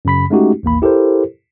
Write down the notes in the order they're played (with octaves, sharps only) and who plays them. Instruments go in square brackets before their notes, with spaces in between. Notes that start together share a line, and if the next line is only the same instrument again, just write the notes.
[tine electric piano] F#2 C#3 B5 B6
G#3 A3 C#4 D#4 F#4 G4
A1 D#2 A#3 B5
E4 G4 A4 A#4 C5